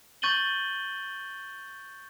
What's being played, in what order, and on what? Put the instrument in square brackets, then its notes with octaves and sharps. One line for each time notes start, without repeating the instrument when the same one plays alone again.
[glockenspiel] C#6 G6 A6 D#7 F#7 G7